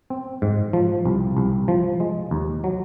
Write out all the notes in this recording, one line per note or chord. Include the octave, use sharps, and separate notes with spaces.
C4
G#2
F3
C2
C2
F3
G#3
D#2
F#3